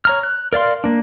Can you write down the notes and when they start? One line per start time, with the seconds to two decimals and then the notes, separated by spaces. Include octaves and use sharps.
0.05 C#5 A#5 F6
0.23 F#6
0.53 A#4 D5 F5 C6
0.84 A#3 D4